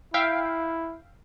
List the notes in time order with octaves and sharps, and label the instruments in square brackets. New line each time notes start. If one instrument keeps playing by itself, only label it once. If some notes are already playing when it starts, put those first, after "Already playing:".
[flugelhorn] E4 [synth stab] E5 F5 G5